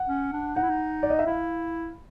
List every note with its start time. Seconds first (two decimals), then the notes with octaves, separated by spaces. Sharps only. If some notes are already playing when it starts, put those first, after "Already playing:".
Already playing: F#5
0.09 C#4
0.33 D4
0.56 D#4 F#5
0.63 E4
0.70 D#4
1.03 D5
1.10 D#5
1.19 E5
1.27 E4 F5